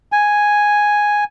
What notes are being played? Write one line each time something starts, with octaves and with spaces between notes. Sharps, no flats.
G#5